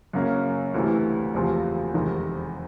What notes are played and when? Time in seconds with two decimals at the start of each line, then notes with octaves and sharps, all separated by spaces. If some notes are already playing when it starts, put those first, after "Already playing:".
0.13 F#2 C#3 F#3 A#3 C#4
0.74 D2 C3 E3 A3
1.34 F#1 E2 C3 F3 A3
1.94 F1 E2 C3 D#3 G#3